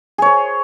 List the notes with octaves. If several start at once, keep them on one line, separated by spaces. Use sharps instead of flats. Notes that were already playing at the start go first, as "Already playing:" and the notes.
G#4 C5 C#5